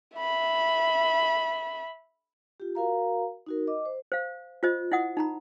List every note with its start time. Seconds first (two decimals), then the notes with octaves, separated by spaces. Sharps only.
0.17 E5 B5
2.60 F4 G4
2.75 F#4 A#4 F5 A#5
3.46 D#4 F#4 A#4
3.67 D#5 D6
3.85 C5
4.12 C5 F5
4.63 F4 C5 D#5
4.92 E4 D#5 F#5 D#6
5.17 D#4 A#5 B5